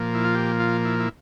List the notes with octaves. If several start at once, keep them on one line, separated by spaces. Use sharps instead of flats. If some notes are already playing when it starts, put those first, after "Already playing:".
Already playing: A#2 F3 A#3
E4
F4
G4
F4
E4
E4